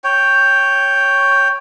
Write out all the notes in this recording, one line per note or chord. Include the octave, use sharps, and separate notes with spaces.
C#5 G5